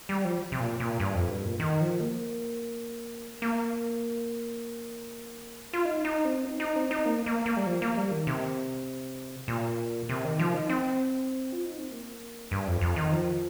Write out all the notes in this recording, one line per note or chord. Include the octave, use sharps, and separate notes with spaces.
G3
F3
C3
A#2
A#2
G2
F2
G2
A#2
D#3
F3
A#3
A#3
F4
D#4
D#4
C4
D#4
D#4
C4
D#4
A#3
A#3
A#3
G3
F3
A#3
G3
D#3
C3
A#2
C3
D#3
F3
D#4
C4
F4
D#4
C4
A#3
G2
F2
F2
D#3
F3